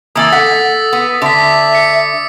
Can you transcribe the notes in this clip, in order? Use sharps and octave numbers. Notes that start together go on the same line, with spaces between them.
E3 A#3 D#6 E6 A6
A4 F#5 B6
B3
D3 E5 D6 B6
B6 C#7